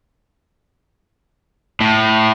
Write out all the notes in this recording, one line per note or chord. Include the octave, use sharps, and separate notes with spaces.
A2